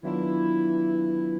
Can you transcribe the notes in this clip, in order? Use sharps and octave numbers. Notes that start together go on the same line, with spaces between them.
D#3 E3 F#3 B3 D4 E4 F4